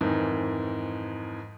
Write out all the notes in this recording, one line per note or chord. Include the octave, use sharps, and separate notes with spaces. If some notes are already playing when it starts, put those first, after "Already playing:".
F2 G#2 D#3 E3